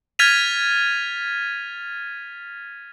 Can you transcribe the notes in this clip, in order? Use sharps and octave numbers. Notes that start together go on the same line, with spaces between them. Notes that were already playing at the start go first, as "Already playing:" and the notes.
F6 G#6 A6 B6 D#7 F7